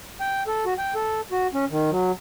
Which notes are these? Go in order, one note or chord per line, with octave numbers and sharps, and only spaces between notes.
G5
A4
F#4
G5
A4
F#4
C#4
D#3
F#3